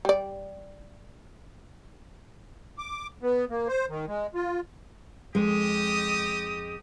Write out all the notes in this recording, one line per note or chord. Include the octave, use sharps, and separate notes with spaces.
G3 D5
D6
B3
A#3
C5
D#3
G#3
F4
F2 G#3 G4 D#5 D#6